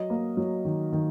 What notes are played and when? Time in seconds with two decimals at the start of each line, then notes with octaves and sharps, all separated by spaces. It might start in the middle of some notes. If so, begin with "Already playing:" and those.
Already playing: F#3 D#5
0.10 A#3
0.37 F#3
0.65 D#3
0.93 D#3